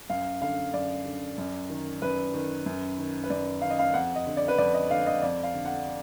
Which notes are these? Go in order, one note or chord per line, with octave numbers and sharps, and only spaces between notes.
F#2 F5
D3 F5
F#2 D5
D3
F#2
D#3
F#2 B4
D#3
F#2
D#3
B4
F#2 D5
D#3 F5
D#5
F5
F2 F#5
D#5
D3
D5
B4
F2 D5
D#5
D3 F5
D#5
F2 D5
F5
D3
F#5